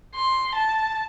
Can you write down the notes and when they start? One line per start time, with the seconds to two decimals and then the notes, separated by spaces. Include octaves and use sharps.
0.15 C6
0.55 A5